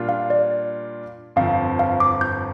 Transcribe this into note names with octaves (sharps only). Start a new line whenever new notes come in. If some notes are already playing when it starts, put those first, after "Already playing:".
Already playing: A#2 G3 D4 F4
F5
D5
G1 F2 F3 C4 F5
F5
D6
G6